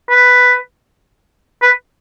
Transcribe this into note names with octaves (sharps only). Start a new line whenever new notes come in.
B4
B4